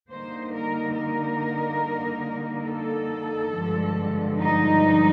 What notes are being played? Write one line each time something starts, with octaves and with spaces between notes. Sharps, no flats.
D3 G3 A#3 D#4 C5
A#4
A#4
A4
G2 D3 F3 G#3
D#4